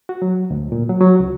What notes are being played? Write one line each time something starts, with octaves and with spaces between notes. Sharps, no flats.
F#4
F#3
D2
A#2
F#3
F#3
C#2